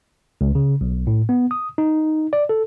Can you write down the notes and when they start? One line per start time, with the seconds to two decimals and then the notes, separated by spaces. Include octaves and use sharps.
0.41 C#2
0.55 C#3
0.81 B1
1.07 A2
1.29 B3
1.51 D#6
1.78 D#4
2.33 D5
2.49 A4